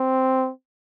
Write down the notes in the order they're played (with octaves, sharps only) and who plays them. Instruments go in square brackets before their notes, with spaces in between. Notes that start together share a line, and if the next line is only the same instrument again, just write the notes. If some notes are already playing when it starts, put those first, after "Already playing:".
Already playing: [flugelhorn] C4